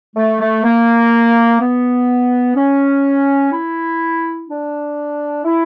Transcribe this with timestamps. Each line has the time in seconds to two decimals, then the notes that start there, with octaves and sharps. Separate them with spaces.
0.16 A3
0.40 A3
0.63 A#3
1.60 B3
2.56 C#4
3.52 E4
4.47 D4
5.43 E4